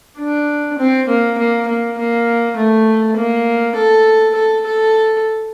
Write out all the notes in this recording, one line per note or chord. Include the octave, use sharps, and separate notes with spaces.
D4
C4
A#3
A#3
A#3
A#3
A3
A#3
A4
A4
A4